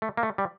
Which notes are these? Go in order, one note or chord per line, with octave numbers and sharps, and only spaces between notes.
A3
A#3
A3
G3